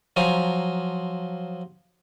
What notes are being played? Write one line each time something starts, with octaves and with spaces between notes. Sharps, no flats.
F3 F#3 G#5 A#5